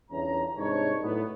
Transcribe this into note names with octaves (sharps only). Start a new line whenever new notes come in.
G1 E2 G2 C#4 A#5
C2 G#2 D4 D#4 C#5
A2 F#3 B3